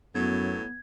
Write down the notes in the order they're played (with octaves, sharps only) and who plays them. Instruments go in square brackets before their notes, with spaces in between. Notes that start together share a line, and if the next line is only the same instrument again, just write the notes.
[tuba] F#2 [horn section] A2 F#3 [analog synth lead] B3 [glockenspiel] G#6